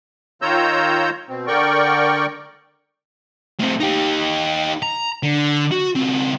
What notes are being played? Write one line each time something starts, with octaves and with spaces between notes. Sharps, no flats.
D#3 F4 C#5 A#5 E6 G6
B2 C4
D3 A#4 D5 G5 C#6
A2 C4
D#4 G4
A#5
D3
F#4
C#2 C4